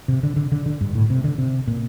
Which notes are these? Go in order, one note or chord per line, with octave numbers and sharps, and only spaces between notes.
C3
D3
D3
D3
D3
G2
A2
C3
D3
C3
A#2